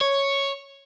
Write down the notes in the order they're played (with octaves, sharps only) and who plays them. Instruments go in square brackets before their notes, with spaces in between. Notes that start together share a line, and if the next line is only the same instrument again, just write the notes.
[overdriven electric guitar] C#5